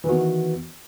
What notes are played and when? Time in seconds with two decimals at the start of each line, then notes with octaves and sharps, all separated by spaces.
0.04 E3
0.06 D#3
0.09 F#4
0.12 B3